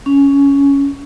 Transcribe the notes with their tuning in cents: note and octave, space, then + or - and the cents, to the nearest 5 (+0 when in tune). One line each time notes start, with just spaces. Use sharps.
C#4 +10